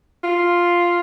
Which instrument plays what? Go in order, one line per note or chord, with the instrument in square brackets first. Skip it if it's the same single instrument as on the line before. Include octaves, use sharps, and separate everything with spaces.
[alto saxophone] F4